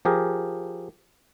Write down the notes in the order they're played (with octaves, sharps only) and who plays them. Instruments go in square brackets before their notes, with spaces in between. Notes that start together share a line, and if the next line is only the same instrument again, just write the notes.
[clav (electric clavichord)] F3 G4 G#4 A#4